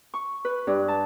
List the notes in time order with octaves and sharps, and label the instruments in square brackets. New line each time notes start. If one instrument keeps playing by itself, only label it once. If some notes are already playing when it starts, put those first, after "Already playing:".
[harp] C#6
B4
G2
A5